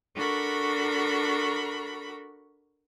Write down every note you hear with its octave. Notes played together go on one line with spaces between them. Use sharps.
D4 F#4 A4 A#4 B5 C#6